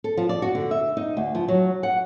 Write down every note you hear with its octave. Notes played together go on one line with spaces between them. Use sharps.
A4
F3
D5
F#4
D3
E5
D#4
D2
F3
F#3
F#5